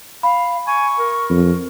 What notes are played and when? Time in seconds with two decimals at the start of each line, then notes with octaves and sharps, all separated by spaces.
0.23 F5 B5
0.67 G#5 C#6
0.99 A#4
1.30 F2